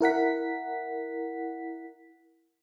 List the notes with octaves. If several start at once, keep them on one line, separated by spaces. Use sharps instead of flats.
E4 A#4 F#5 B6